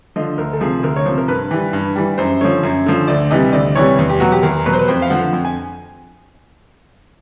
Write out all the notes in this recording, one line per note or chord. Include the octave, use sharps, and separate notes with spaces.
D3 F3 D#5
D2 A#4
A4
C3 F3 G#4
D2 A#4
C#5
C3 F3 C5
A#4
G2 B4
E3 G3
G2
E3 G3
F#2 C5
D3 F3 C#5
F#2
D3 F3
D2 D5
C3 E3 G3 D#5
D2 D5
C3 E3 G3 C#5
E2
G4
B2 F#3 F#4
G4
E2 A#4
B2 F#3 B4
C5
B4
F2 C5
F5
D3 F3 F#5
F2
G#5